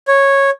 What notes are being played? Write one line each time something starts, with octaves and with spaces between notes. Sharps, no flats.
C#5